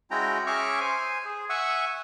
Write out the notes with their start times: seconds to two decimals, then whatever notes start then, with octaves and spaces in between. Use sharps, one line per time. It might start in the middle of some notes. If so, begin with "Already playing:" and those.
0.11 G#3 C#4 E4 F#4 G5 A#5
0.47 C#4 G#4 E5 C#6 D6 F6
0.80 C5 G#5
1.25 G#4
1.49 E5 F#5 G#5 C#6 E6